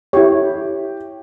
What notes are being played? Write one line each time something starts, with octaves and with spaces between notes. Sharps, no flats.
E4 G4 C#5